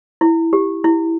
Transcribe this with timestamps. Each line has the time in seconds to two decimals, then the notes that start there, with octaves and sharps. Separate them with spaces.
0.21 E4
0.53 G4
0.84 E4